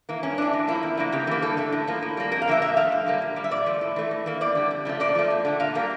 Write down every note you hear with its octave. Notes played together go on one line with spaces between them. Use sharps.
E3 A#3
G2 C#4
E3 A3 D4
A2
F3 A#3 E4
E2
D3 F3 A#3
C#3 G4
E3 A#3
G2 A4
D3 A3
A2
F3 A#3
A2
G3 A#3
F2 A#4
F5
D3 F3 A#3 E5
A#2 E5
F3 A3 F5
G2
D3 G3 A#3
A#2
G3 A#3
E5
A#2 D5
F3 A3
A2
E3 A3
A2
E3 A#3
E2 D5
D3 G3
F2
C#3 F3 A3
A#2 D5
F3 A3
E2
D3 A3
A#2 F5
G3 A#3